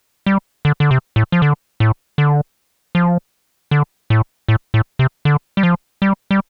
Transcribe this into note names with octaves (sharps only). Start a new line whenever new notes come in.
G3
D3
D3
C3
A2
F3
D3
A2
D3
F3
D3
A2
A2
A2
C3
D3
G3
F3
G3
G3